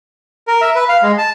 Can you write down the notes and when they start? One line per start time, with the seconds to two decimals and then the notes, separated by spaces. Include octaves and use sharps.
0.48 A#4
0.61 E5
0.75 B4
0.89 F5
1.02 G#3
1.18 A5